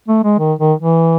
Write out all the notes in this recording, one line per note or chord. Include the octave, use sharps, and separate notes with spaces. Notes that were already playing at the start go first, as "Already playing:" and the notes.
A3
G#3
D#3
D#3
E3